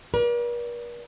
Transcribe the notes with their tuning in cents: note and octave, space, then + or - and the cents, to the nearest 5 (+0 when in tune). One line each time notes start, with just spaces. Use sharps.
A#4 +45 D5 -15